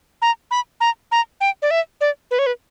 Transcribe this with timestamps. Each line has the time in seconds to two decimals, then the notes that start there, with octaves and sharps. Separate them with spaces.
0.22 A#5
0.51 B5
0.81 A#5
1.12 A#5
1.41 G5
1.62 D5
1.71 E5
2.01 D5
2.31 B4
2.39 C#5
2.46 B4